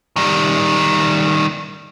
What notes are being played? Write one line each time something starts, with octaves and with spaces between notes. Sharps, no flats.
D#3 G3